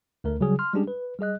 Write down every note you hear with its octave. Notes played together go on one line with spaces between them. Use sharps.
D2 A3 A#4
C#3 F#3 G3 G#4
C6 F6
G3 G#3 C#4 D4 G4 G#4
B4
G3 G#4 D#5 F#6